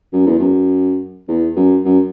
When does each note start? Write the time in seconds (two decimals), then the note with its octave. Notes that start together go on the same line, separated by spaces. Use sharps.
0.13 F#2
0.26 E2
0.39 F#2
1.28 E2
1.56 F#2
1.85 F#2